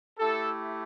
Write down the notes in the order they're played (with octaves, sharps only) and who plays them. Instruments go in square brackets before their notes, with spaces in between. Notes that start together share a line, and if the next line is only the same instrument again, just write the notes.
[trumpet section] A3 E4 G4 A4